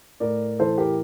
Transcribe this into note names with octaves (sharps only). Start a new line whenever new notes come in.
A2 A#4 D5
E3 A4 C5
G4 A#4